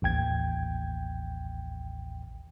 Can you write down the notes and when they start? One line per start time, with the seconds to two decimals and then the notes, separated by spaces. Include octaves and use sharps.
0.02 A1 D#2 G5 G#6